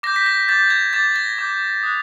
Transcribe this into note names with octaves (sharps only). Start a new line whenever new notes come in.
D6 G6 A#6
B6
A#6
D6 G6 A6
G#6
D6 G6 A6
A#6
D6 G6
D#6 F#6